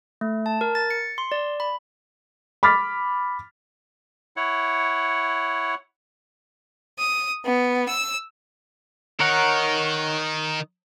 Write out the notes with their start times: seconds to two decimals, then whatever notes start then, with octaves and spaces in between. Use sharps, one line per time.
0.21 A3
0.46 A5
0.61 A#4
0.75 A6
0.91 C#7
1.18 C6
1.32 D5
1.60 B5
2.63 B5 D6 F6 A6 B6
4.37 E4 C#5 F#5
6.97 D#6
7.45 B3
7.88 E6
9.20 D#3 D#4 A#4 C#5 F#5